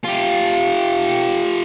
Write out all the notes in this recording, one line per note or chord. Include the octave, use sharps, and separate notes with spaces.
F4 G4